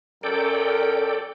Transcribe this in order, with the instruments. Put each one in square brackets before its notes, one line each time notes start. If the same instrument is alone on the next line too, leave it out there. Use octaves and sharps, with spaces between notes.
[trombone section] F#2 C#4 A#4 [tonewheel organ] A4 D5 G5